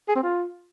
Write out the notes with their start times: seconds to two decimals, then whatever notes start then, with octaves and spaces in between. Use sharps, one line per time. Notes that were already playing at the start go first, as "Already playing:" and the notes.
0.08 G#4
0.16 C4
0.23 F4